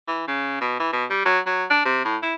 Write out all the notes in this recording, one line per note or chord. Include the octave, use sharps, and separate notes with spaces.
E3
C#3
B2
E3
B2
G3
F#3
F#3
D4
C3
A2
E4